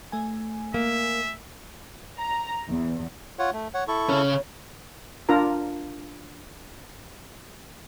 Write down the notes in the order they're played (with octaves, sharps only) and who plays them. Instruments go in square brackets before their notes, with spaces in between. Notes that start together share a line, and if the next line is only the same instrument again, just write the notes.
[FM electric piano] A3 G#5
[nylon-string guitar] A#3 [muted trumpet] E5
[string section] A#5
E2
[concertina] F4 C#5 F#5
A3
C#5 F#5
E4 A4 C#6
[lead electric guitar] C#3 C#4
[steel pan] D4 F4 A#4 A#5